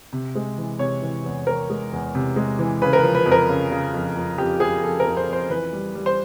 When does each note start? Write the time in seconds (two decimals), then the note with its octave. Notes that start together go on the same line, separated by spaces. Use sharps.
0.13 C3
0.35 G#3
0.58 E3
0.79 C3 C#5
1.02 E3
1.25 E2
1.47 E2 A#4
1.70 G#3
1.92 E2
2.15 C3
2.36 G#3
2.59 E3
2.82 C#3 B4
2.93 A#4
2.99 F3 B4
3.15 B4
3.26 F2
3.31 A#4
3.49 C#3
3.71 C#3
3.94 F2
4.16 F2
4.38 F2 G4
4.60 F2 G#4
4.83 F2 A4
5.00 A#4
5.06 F2
5.17 C5
5.28 F2 C5
5.50 E3 B4
5.73 G3
5.95 G3
6.06 C5